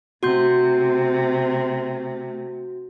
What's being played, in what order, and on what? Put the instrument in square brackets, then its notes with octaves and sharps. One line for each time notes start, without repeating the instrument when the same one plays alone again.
[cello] C3 A3 [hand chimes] F#4 C6 G6